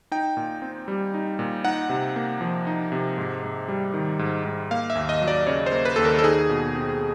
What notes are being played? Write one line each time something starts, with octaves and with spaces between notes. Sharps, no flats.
D#4 G5
A#2
C4
G3
D#4
A#2
D#4 F#5
C3
A#3
F3
D#4
C3
G#2
G#2
G3
D#3
G#2
G#2
A#3 F5
E5
D#2
D#5
F#3
D5
C#3 C#5
C5
A#3
B4
D#2 A4
A#4
A4
D#4 G#4
B2
C4